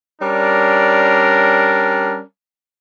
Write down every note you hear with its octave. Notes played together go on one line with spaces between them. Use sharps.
G3 C#4 D4 A#4